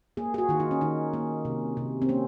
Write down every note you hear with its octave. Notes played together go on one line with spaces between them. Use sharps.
A#3 G#4
G#4
F#4
D#3 F4
D#4
C#4
D#3 D#4
A#3
C3
C3
C4
A#3 C#4